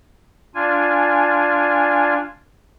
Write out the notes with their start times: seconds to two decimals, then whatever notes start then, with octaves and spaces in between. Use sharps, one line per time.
0.55 D4 F4 G#5